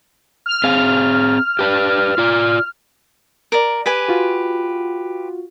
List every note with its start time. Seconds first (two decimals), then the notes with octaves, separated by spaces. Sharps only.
0.46 F6
0.64 C4 G#4 F5
1.59 G4 B4 D5
2.18 F4 D5
3.52 A#4 D5
3.86 G4 B4 G#5
4.08 F4 F#4